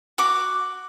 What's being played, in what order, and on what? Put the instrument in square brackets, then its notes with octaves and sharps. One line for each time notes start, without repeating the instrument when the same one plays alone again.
[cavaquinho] F#4 D6